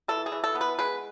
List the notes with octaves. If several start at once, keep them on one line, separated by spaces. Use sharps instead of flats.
E3 A4
G#4
E3
A4
B3
B4
G#3 B4